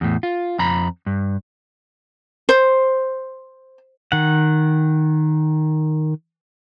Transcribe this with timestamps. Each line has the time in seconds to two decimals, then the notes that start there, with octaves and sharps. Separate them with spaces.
0.01 E2 A2
0.23 F4
0.59 F2 A#5 B5
1.06 G2
2.49 C5
4.12 D#3 F#5